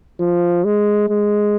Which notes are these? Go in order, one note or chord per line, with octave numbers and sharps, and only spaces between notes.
F3
G#3
G#3